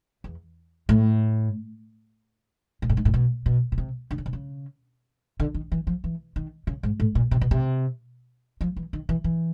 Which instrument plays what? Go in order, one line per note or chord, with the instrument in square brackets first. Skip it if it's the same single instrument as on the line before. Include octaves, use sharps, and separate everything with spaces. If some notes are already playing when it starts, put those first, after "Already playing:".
[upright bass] E2
A2
A#2
A2
G#2
A2
B2
B2
B2
C3
D3
C#3
C3
C#3
D3
D#3
E3
F3
E3
D#3
C#3
G#2
A2
A#2
C3
B2
C3
F3
E3
D#3
E3
E3